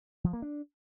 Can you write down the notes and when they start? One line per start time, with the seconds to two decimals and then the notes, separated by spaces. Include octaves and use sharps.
0.24 F3
0.33 A#3
0.42 D4